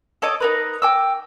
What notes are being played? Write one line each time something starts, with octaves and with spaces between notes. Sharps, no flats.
A4 C#5 D#5 D6
D#4 A#4 B4
G5 D6 E6